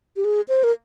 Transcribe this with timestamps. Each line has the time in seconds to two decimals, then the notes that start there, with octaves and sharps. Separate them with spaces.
0.16 G4
0.25 G#4
0.48 C5
0.64 A#4